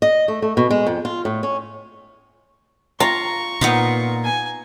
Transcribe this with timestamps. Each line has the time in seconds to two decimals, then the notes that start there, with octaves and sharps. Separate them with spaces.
0.02 D#5
0.28 A3
0.42 A3
0.57 B2
0.71 G#3
0.86 F2
1.05 F4
1.25 A2
1.43 C#4
3.00 F4 A#5 C#6
3.61 A#2 B3 D#4 F4
4.24 G#5